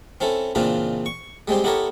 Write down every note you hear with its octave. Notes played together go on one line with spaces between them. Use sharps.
C4 C#4 E4 A4
A#2 C#3 E3 C4 D4 F4
C#6
G3 G#3 C4 G4
B3 E4 G4 A4 A#4 C#5